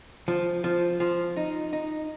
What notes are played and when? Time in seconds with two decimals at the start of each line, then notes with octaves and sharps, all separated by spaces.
0.28 F3
0.64 F3
1.00 F3
1.37 D#4
1.73 D#4